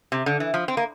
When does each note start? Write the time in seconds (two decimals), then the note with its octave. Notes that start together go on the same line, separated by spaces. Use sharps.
0.12 C3
0.26 D3
0.40 E3
0.54 F3
0.68 C4
0.77 A#3